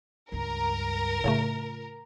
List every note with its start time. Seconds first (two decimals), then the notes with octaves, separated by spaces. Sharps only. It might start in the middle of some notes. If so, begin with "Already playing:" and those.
0.32 C#2 G2 A#4
1.24 A2 C#3 A3 F4